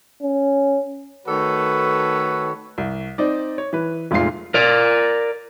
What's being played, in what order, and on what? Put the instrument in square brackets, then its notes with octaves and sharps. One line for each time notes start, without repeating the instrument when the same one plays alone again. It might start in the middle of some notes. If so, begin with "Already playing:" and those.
[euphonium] C#4
[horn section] D#3 A3 F#4 A4 B4 C#5
[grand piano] C2
C4 D#4 D5
C#5
E3 B4
F1 A#2 G#3 A3 F4 C7
[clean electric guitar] A#4 D5